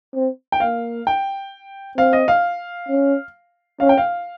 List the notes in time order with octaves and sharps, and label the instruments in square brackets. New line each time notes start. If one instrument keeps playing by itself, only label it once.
[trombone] C4
[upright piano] G5
[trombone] A#3 [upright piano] F5
[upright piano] G5
[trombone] C4 [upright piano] F5
[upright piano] D#5
F5
[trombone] C#4
[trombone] C#4 [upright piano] F5
[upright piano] G5
F5